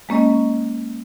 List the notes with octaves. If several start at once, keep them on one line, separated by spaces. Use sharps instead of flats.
G#3 A#3 C#4 D#5